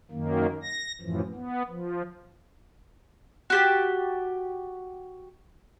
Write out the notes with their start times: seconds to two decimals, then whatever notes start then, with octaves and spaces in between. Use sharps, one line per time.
0.11 F#2 D#3 A#3
0.63 A#6
1.01 F#2 A2 E3 F3
1.34 B3
1.68 F3
3.50 F#4 G4 A5